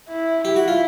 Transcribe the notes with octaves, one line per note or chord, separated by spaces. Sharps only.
E4
E4 G4
F#4
F4